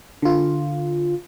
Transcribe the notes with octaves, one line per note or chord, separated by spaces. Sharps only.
D3 F4